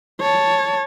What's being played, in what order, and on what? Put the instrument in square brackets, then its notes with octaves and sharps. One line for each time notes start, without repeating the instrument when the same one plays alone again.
[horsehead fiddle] C#5 A5